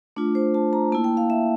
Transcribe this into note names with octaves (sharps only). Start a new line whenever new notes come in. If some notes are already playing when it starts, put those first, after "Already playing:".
A3 D4 F4
C5
A5
A#5
A#3 E4 A5
G5
F5
E5